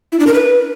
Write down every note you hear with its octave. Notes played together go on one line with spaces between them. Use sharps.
E4
D4
A#4
B4